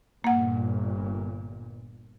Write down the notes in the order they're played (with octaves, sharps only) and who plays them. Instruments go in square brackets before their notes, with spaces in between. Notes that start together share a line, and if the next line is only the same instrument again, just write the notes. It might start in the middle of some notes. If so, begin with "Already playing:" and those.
[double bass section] G1 A#2 [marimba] A#3 F#5